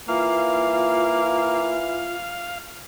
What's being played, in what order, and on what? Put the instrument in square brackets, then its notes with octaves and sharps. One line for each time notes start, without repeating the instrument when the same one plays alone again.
[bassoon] E3 [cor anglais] A#3 [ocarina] F4 [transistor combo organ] F5